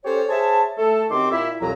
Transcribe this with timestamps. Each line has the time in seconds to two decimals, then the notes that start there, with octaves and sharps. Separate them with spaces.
0.04 C#4 G4 A4 C5 C#5
0.29 G#4 C5 C#5 E5 A5
0.77 A3 A4
1.10 F#2 D#3 C4 G4 C6 D6
1.31 A#2 E4 E5
1.60 C2 F2 B2 F#3 A#5